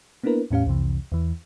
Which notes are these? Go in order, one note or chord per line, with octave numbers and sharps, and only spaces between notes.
A#3 B3 D4 E4 A#4 B4
E2 A2 C#4 G4 F5
C2 F2 C3 E3
E2 E3